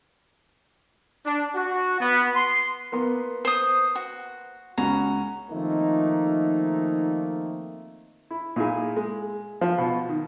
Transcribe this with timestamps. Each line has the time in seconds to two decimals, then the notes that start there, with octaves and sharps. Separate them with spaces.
1.26 D4
1.55 F#4
2.00 B3
2.35 C6
2.92 A#3 B3 C6
3.45 C5 D#6
3.95 F#4
4.78 C#2 C#4 F#4 A#5
5.50 D#3 F3 A3 A#3 C4 D#4
8.30 E4
8.56 A#2 D#4 E4 G#4
8.97 G#3
9.61 F3
9.78 B2 F4
10.09 D#3